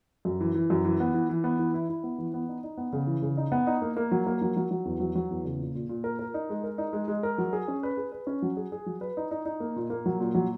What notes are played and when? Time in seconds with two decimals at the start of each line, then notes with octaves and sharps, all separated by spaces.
0.25 F#2
0.40 E3
0.54 E3
0.70 F#2
0.85 E3
1.00 B3
1.14 E3
1.29 E3
1.44 B3
1.59 E3
1.74 E4
1.89 E4
2.04 B3
2.18 E3
2.34 B3
2.49 D#4
2.63 D#4
2.78 B3
2.93 C#3
3.07 E3
3.22 C#3
3.37 D#4
3.52 B3
3.67 D#4
3.82 A#3
3.97 A#3
4.12 F#3
4.27 A#3
4.42 F#3
4.57 F#3
4.71 F#3
4.85 E2
5.00 F#3
5.15 F#3
5.31 E2
5.45 C#3
5.59 A#2
5.75 A#2
5.89 A#2
6.04 A#4
6.19 A#4
6.34 D#4
6.50 G#3
6.64 A#4
6.78 D#4
6.93 G#3
7.08 G#3
7.23 A#4
7.38 F#3
7.53 G#4
7.68 C#4
7.83 B4
7.97 G#4
8.12 B4
8.27 C#4
8.42 F#3
8.57 G#4
8.72 G#4
8.86 F#3
9.01 B4
9.17 D#4
9.31 D#4
9.45 D#4
9.60 A#3
9.76 A#2
9.90 A#3
10.06 F#3
10.20 A#2
10.35 F#3